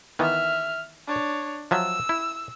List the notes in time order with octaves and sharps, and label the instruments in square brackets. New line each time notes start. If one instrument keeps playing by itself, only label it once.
[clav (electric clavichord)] D#3 E3 B3 [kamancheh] E5 F6
[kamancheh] D4 C#5
[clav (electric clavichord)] F3 F#3 E5 [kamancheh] E6
[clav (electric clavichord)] E4